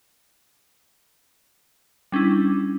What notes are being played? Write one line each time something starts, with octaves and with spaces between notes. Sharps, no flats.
G3 C#4 D4 E4